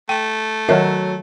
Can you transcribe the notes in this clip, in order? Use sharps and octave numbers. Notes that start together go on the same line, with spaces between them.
A3 G5
D#3 F#3 A#4 C#5 D#5 E5 F#5